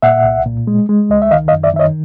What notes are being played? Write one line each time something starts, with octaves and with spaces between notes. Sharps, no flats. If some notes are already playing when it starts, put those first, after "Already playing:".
A#2 E5 F#5
C2
A#2
G#3
G#3
C#2 D#5
E5
D#3 D#5 F5
D#5 F5
F#2
D5 E5
D#3 E5
C#5 D#5